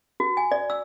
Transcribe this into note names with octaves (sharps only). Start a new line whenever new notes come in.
F#4
G#5
D5
E6